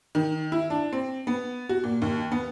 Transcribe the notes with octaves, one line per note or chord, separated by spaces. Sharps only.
D#3
E4
D4
C4
B3
F#4
A#2
D#2
B3